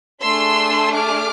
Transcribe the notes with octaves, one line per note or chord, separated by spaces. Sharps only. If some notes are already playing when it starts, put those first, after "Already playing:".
A3 D4 G#4 C6 E6
D6 F6